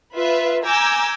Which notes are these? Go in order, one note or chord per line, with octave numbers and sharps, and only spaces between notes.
F4 B4 E5
G#5 A#5 D6 E6 G6 G#6